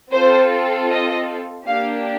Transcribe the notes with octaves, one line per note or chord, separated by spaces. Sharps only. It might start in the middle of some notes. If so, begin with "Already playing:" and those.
C4 F4 A4 C5
D#5
A#3 D4 G4 F5